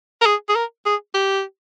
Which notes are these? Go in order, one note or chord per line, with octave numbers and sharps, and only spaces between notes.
A#4
G#4
G#4
A#4
G#4
G4